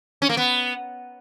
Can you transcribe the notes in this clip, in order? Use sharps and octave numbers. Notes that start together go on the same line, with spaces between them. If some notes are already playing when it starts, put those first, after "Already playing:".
C#4
A#3
B3